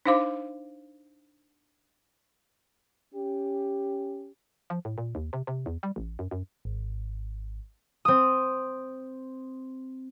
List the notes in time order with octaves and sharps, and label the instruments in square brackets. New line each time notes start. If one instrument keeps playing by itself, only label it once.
[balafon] D4 D#4 C5 F5 D6
[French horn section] C#4 G4
[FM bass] F3
A2
A#2
D#2
C3
C3
E2
G3
A1
F#2
F#2
[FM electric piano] G#1
[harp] C4 D#6